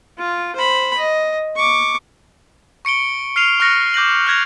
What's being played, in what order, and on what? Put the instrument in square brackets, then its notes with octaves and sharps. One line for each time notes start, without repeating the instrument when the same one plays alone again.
[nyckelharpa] F4
C5 B5
D#5
C#6 D6
[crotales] C#6 C#7 D7 G7
F6 C7 C#7 D#7 F7
C#6 F6 F#6 A#6 C#7
D6 G6 A#6 F#7
F6 F#6 G#6 A#6 F7